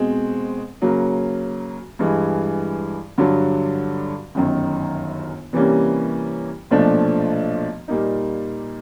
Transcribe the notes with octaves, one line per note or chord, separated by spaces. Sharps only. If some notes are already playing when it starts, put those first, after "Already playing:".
Already playing: B2 G#3 C4
C#3 F#3 A#3
G2 E3 G#3
G2 D3 F#3
G1 F#2 D#3
C3 E3 G3 A#3 C#4
B1 A#2 F3 A3 D4
A#2 G3 A#3 D#4